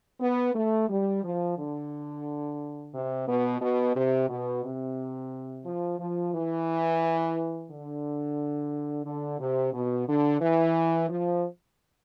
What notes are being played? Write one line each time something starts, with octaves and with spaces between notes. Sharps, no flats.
B3
A3
G3
F3
D3
C3
B2
B2
C3
B2
C3
F3
F3
E3
D3
D3
C3
B2
D3
E3
F3